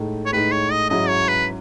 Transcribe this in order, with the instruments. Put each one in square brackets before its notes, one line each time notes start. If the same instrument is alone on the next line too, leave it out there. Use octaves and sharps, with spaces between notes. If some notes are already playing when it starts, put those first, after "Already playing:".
Already playing: [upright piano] A2 G#3 D#4
[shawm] C#5
[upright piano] A2 G#3 D#4 [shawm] B4
[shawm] C#5
D#5
[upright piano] G#2 F#3 C#4 E4 [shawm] D#5
[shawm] C#5
B4